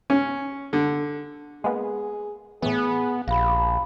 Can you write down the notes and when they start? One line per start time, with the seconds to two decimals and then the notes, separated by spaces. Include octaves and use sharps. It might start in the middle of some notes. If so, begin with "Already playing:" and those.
0.10 C#4
0.73 D3
1.64 G#3 A#3 B3 G#4
2.62 A2 E3 B3 G#4
3.28 A#1 G4 F5 B5